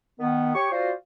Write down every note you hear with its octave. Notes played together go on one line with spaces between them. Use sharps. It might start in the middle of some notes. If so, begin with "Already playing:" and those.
D#3 B3
G4 C#5 C#6
F4 F#4 C5 D5